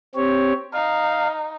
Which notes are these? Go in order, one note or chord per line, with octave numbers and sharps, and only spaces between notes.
C4 G4 C#5
D#4 F5